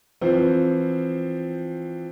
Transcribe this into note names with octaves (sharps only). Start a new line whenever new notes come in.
E3 F3 C4